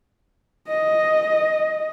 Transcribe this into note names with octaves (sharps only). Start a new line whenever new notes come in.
D#5